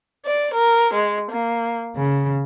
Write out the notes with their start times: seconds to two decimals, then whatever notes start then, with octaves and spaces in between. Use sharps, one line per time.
0.25 D5
0.53 A#4
0.93 G#3
1.30 A#3
1.95 C#3